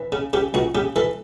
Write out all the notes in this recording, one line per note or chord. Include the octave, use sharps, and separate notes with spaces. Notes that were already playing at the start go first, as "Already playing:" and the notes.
Already playing: E3
C#3
C#3 G4
C#2 F#4
C#3 G4
E3 A4